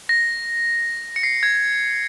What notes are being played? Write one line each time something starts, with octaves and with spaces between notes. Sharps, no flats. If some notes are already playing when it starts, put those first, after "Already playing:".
A#6
C#7
C7
G#6